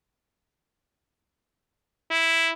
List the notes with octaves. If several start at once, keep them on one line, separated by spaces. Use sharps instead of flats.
E4